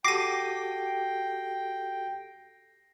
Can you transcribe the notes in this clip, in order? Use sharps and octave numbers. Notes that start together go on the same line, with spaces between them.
F#4 G4 A4 G5 D6 A#6 C7 D#7